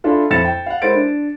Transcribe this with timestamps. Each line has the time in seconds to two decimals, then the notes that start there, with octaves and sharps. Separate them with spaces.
0.04 D4 E4 F4 A4
0.30 F2 E4 A6 C#7 E7
0.45 G5
0.66 F5 F#5
0.82 G#3 E4 A#4 C5 A6 D7
0.95 D4